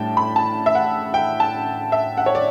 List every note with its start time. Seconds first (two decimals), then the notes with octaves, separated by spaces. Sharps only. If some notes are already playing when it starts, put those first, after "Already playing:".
Already playing: A2 G3 D4 G5 A5
0.17 B5
0.36 A5
0.66 E5
0.75 F#5
1.14 G5
1.40 A5
1.92 E5
2.17 F#5
2.26 C#5
2.35 D5